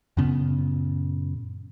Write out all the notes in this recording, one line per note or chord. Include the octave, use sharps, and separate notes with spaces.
F#2 A#2 C#3 B3